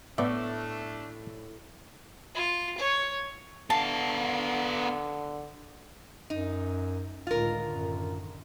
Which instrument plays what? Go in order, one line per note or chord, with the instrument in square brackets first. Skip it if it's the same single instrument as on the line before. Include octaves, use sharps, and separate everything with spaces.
[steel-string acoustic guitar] A2 [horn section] A3 D4 [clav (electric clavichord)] B3 D5 E5
[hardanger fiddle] F4
C#5
[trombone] D3 [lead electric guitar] B3 F5 [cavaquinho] A5
[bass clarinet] F#2 [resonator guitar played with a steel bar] D#4
[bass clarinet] C#2 [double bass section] A2 D3 D#3 [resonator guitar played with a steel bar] F4 A#4
[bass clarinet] F#2